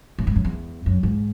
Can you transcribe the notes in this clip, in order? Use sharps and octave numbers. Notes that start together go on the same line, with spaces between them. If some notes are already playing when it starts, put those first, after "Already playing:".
A2
G#2
F#2
E2
F#2
G#2